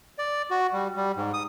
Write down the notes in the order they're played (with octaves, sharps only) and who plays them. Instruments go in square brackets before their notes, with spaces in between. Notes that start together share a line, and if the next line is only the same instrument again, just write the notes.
[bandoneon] D5
F#4
G3
G3
G#2
D#6